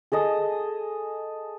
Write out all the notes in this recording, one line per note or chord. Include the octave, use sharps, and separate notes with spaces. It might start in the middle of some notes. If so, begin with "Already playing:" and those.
G#4 A4 D#5